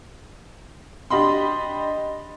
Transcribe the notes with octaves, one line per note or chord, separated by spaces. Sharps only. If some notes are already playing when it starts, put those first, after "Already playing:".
D4 G4 D#5 B5 C6